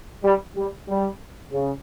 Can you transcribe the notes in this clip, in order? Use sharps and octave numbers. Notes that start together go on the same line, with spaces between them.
G3
G3
G3
C#3